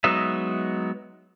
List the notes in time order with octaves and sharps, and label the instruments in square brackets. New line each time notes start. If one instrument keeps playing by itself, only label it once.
[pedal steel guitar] F#3 G#3 B3 D#4 E5